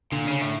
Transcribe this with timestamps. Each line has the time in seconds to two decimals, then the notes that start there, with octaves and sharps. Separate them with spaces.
0.12 A#2 D3
0.27 C#3
0.41 A2